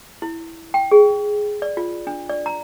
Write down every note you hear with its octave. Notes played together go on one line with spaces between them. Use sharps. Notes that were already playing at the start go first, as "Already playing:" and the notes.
E4
G5
G#4
D5
F4
D4
D5
A#5